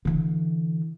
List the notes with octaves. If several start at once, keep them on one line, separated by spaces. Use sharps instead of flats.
D3 E3